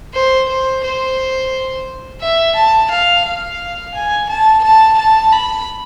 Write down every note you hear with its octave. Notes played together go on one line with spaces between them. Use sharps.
C5
C5
C5
E5
A5
F5
F5
G#5
A5
A5
A5
B5